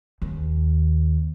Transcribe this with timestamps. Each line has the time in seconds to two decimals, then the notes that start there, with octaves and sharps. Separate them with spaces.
0.22 D#2